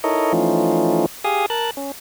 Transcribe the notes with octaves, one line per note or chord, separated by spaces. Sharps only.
D#4 E4 A4 A#4 C#5 D#5
E3 F3 A3 C#4 D#4 F4
G4 G#4 F5 G#5 D#6
A#4 A5 F#6
C#4